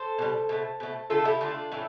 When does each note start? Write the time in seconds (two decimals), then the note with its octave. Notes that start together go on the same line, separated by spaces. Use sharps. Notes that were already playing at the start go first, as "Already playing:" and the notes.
Already playing: A4 C5
0.19 B2 G3
0.49 B2 A3
0.80 B2 A3
1.10 D3 A3 F4 A4
1.25 E4 G4
1.41 D3 A3 D4 F4
1.72 A2 E3 A3